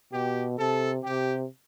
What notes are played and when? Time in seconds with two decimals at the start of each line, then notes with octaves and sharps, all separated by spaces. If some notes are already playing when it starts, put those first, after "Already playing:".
0.13 B2 G4
0.58 C3 A4
1.03 C3 G4